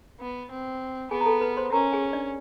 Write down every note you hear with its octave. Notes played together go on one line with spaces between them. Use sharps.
B3
C4
B3 G#4 G#5
A#5
A4 A5
B4 B5
C5 C6
C#4 A#4 A#5
G#4 G#5
D4 D5